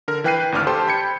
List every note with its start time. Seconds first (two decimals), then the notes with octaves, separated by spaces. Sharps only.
0.08 D3 A#4 F6
0.24 E3 B4 G5 F#6 C7 D#7
0.52 G#1 D2 D4 D6 F6
0.67 G4 A4 C5 A5 C6
0.87 G5 B5 G6 G#6 C#7